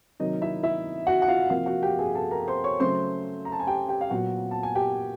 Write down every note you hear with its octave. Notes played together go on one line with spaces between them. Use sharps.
C3 D#3 F#3 A#3 D#4 D#5
E4 E5
E4 E5
F#4 F#5
F#5
F4 F5
C3 F3 A#3 F4 F5
F#4 F#5
G4 G5
G#4 G#5
A4 A5
A#4 A#5
C5 C6
C#5 C#6
C#3 F#3 A3 C5 C6
A#5
A5
G#5
G4 G5
G4 G5
F5
A#2 F#3 B3 F#4 F#5
A5
G#5
G4 G5